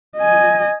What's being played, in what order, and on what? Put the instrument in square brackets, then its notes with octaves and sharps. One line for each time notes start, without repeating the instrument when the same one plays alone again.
[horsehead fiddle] D#5 G#5